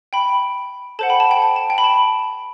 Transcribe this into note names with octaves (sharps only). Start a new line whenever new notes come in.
G5 B5
A4 C5 F#5 A5
G5 B5
A5
G5 B5
A5
A5
G5
B5
A5